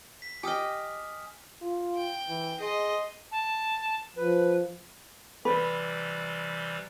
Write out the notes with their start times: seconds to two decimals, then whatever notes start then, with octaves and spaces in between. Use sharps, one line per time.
0.22 B6
0.43 G4 D#5 G#5 D#6 F6
1.62 F4
1.95 G5
2.28 E3
2.60 G#4 D#5 C6
3.32 A5
4.16 F3 B4
5.45 C3 E3 G3 B4